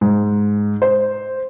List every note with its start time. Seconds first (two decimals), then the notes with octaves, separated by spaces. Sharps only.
0.01 G#2
0.82 C5